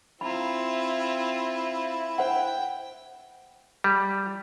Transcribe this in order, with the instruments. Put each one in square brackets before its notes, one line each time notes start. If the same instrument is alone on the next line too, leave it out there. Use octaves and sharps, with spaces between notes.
[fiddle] C4 F4 [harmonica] E4 [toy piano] A#5 B5
[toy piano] C5 F#5 [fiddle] G5
[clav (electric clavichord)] G3